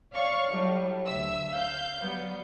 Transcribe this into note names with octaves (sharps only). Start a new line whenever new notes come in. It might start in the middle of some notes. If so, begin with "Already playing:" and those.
C#5 D5 F5 C#6
A2 F#3 G3
D2 E5 E6
F5 G6
F#3 G3 B3